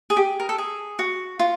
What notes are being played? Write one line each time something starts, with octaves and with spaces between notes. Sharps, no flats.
G#4
G4
A#4
A4
G#4
F#4
F4